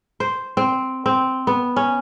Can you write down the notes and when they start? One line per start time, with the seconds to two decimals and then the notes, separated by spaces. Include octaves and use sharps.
0.20 C5
0.57 C4
1.06 C4
1.47 B3
1.76 C#4